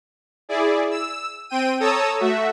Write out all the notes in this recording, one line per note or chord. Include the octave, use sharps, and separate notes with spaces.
E4 G#4 D5
E6
C4 G5 D#7
A4 C#5 A5 A#5 D#6 E6
A3 F#4 E5